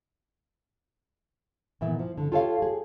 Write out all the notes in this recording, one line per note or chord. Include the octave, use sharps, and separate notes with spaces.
A#2 D#3 E3 B3 E5
F3
D3
F4 G4 A4 C#5 E5 F5
G4 G#4